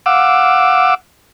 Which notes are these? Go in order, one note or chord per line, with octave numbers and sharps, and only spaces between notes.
F5 F#5 D6 E6